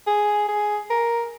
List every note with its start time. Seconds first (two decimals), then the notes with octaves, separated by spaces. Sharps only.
0.07 G#4
0.48 G#4
0.90 A#4